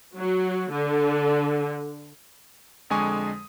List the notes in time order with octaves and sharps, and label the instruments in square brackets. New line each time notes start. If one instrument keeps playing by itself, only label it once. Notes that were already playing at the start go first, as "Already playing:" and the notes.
[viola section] F#3
D3
[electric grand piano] F2 D3 G#3 G#5 C#6 D#6